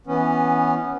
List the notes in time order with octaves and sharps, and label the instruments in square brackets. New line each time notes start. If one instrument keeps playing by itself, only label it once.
[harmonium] E3 B3 C#4